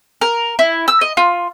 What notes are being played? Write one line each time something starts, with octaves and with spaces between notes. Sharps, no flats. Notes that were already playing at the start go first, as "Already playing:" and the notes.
A#4
E4
E6
D#5
F4